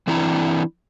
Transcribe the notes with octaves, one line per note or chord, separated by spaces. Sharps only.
E3 C4 D4 E4 A#5